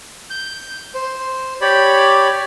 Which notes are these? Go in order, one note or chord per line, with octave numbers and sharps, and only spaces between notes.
G6
C5
G4 C#5 D5 B5